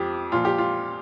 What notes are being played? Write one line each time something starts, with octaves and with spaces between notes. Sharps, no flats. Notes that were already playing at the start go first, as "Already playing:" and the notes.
Already playing: F2 F3 G4
A#2 F3 F4
G4
F4